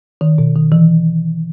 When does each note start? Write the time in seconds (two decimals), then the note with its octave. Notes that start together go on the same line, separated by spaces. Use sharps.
0.21 D#3
0.38 B2
0.56 D#3
0.72 E3